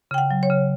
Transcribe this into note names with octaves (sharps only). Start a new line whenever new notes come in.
C#3 G5
F#5
F#3
C#5
C#3